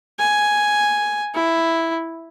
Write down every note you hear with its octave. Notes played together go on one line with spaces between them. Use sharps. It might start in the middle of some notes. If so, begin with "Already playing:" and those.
G#5
E4